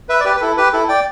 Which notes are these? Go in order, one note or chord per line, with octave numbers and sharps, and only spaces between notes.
B4 E5
D5
G4 B4
B4
E4 A4
G4 B4
E4 A4
D5 G5